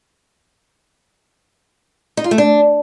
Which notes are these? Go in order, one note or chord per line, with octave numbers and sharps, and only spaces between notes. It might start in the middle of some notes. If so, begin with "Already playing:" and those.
D#4
F4
A3
D4